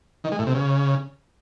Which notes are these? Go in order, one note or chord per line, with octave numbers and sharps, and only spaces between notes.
D#3
G#3
A2
C3
C#3